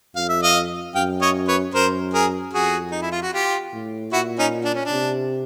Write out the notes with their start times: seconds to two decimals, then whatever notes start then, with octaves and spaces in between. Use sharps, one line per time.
0.16 F2 F5
0.29 E5
0.43 D#5 F5
0.95 F#2 F5 G5
1.21 C#5 D#5
1.48 B4 C#5
1.74 F#2 A#4 C5
2.14 G#4 A#4
2.53 F2 F#4 G#4
2.91 D#4
3.02 E4
3.12 F4
3.22 F#4
3.33 F4 G4
3.73 A2
4.12 A#2 E4 F#4
4.39 C#4 D#4
4.65 D4
4.75 C#4
4.85 D4
4.92 C3